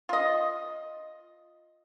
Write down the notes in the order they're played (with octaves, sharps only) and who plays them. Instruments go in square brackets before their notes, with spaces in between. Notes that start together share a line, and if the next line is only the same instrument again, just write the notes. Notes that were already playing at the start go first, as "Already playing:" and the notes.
[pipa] F4 D#5